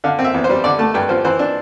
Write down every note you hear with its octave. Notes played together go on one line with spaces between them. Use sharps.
D3 F5
C4
E5
E2
C5
G3
D3 D5
A3 A5
G2 G5
F3 C5
E3 C5
D4